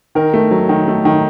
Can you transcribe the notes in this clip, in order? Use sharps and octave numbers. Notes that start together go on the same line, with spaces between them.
D#3 A#4
A3
F#3
D#3
A3
D#3